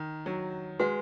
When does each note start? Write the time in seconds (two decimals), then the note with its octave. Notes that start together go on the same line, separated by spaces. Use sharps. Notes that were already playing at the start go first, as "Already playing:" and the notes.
Already playing: D#3
0.26 F#3
0.79 G#3 F#4 B4 F#5